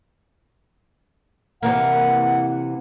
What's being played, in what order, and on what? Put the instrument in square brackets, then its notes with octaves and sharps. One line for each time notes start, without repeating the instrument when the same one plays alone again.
[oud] C3 E3 A#3 [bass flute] F#5